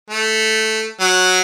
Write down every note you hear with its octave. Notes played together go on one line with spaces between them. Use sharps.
A3
F#3